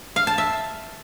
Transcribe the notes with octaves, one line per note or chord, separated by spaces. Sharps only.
F5
A5
E5